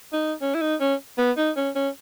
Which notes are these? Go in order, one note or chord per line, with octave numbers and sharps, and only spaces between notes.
D#4
C#4
E4
D#4
C#4
B3
D#4
C#4
C#4